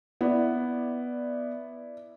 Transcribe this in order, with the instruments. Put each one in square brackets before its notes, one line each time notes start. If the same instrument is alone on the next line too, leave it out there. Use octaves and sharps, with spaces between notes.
[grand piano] B3 [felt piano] E4 D5